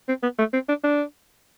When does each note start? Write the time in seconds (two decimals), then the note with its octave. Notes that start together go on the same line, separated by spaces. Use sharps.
0.08 C4
0.23 B3
0.38 A3
0.53 C4
0.68 D4
0.84 D4